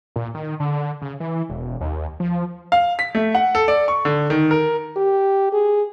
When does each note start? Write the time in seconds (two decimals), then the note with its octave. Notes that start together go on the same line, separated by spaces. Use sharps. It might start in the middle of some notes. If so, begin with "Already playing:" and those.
0.16 A#2
0.34 D#3
0.60 D3
1.02 C#3
1.20 E3
1.49 E1
1.81 D#2
2.20 F3
2.72 F5
2.99 B6
3.15 A3
3.35 F#5
3.55 A4
3.68 D5
3.88 C#6
4.05 D3
4.30 D#3
4.51 A#4
4.96 G4
5.53 G#4